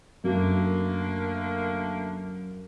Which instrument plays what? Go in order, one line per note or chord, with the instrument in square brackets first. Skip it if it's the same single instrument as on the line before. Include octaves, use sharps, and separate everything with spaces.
[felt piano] F#2 [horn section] D3 A3 A#3